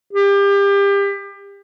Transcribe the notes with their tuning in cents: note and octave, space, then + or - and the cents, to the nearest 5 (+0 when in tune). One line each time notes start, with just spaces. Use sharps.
G4 +30